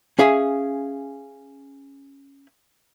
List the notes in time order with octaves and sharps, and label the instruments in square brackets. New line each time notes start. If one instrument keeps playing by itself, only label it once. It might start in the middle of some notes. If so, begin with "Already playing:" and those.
[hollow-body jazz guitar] C#4 G#4 E5 F5 G#5